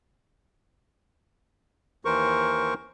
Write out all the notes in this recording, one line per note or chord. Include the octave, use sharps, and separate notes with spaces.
D#2 E3 A#4 C5 C#6